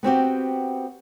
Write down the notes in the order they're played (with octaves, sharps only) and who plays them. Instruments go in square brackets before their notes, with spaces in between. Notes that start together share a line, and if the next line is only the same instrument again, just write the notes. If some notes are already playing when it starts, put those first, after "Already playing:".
[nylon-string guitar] B3 C4 F#4 G4